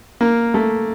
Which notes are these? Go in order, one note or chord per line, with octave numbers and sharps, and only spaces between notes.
A#3
A3